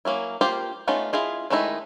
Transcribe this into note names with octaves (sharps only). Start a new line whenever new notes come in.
F#3 A#3 C#4 E4
A#3 F4 G4 C5 F5
A3 B3 C#4 D#4 F4
E4 F4 G#4 D#5
D#3 G#3 A3 D#4 E4